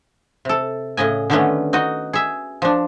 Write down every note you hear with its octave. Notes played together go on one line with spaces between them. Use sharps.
C3 A4
A2 C#3 D#5 G#5
D3 D#3 G3 A3 B3 C#4
D#4 F#4 D#5
G#4 E5
F3 D4